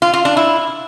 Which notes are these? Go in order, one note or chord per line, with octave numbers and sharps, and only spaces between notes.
F4
F4
D4
E4